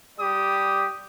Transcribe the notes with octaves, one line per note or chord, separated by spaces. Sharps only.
G3 G4 D5 D#6